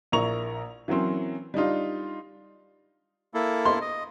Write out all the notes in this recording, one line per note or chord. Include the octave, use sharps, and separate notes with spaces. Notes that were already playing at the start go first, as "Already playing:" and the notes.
A#1 A#3 E4 A#5 C#6 F7
E3 F#3 A#3 C4 C#4
G3 D4 D#4 F4
A#3 E4 A4
C6
D#5